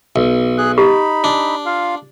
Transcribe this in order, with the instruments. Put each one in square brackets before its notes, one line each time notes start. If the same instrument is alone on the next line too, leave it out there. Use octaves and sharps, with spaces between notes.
[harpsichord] B1
[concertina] G#4 F#6
[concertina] D#4 B5 [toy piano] G4
[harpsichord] D4
[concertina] F4 F5